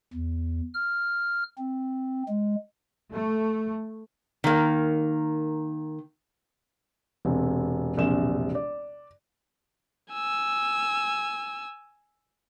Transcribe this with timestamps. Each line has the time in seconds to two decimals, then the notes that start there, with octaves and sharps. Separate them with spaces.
0.14 E2
0.74 F6
1.58 C4
2.29 G#3
3.13 A3
4.44 D#3 A#3
7.25 E1 C3
7.97 E1 A#1 C3 E7
8.55 D5
10.13 G#5 E6